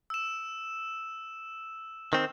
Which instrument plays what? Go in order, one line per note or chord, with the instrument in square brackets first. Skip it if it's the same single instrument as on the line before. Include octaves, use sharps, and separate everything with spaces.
[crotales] E6 E7
[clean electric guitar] D#3 C4